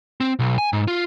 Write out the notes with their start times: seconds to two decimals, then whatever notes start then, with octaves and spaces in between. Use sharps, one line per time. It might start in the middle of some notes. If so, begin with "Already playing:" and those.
0.21 C4
0.39 B1
0.58 G#5
0.73 G#2
0.88 F4